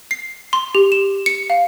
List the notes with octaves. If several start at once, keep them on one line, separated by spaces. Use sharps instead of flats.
C7
C6
G4
E7
C#7
F5